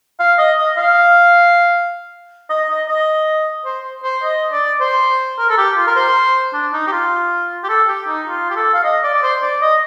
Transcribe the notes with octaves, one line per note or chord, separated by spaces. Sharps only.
F5
D#5
D#5
F5
D#5
D#5
D#5
C5
C5
D#5
D5
C5
A#4
A4
G4
F4
A#4
C5
D4
D#4
G4
F4
G4
A4
G4
D#4
F4
G4
A4
F5
D#5
D5
D5
C5
D5
D#5